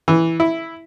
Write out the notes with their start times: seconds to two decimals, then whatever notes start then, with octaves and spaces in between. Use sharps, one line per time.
0.08 E3
0.40 E4